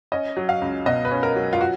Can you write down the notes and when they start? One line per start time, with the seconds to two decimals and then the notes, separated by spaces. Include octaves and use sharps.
0.12 C#4 D#5
0.37 F#3
0.49 F5
0.62 C#2
0.86 B2 D#5
1.05 B4
1.11 C#4
1.23 A#4
1.36 F#3
1.53 F4
1.61 F#4